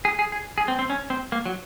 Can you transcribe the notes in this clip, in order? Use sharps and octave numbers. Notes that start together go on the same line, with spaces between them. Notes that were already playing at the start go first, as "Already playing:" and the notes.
G#4
G#4
G#4
G#4
C4
C4
C#4
C4
A#3
F#3